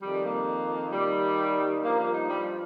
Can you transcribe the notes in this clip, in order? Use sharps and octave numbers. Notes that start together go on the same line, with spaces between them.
F2 D#3 G3
A#3
D#2 D#3 G3
G2 F3 A#3
A#3
D#4
G3